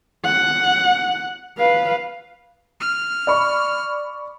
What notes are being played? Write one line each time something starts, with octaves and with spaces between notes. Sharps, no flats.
F#5
B4 F5
F6
D5 B5 C#6